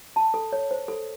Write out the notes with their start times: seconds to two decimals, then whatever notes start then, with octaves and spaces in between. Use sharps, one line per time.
0.16 A5
0.34 A4
0.53 C#5
0.71 C5
0.88 A4